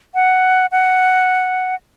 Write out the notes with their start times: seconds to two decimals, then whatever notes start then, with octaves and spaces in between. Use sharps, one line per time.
0.15 F#5
0.72 F#5